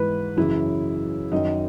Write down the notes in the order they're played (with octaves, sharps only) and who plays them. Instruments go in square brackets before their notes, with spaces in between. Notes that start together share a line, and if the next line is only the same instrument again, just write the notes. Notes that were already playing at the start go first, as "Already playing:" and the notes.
Already playing: [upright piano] G#2 E3 B4
F#2 C#3 E3 E4
F#2 D#3 D#4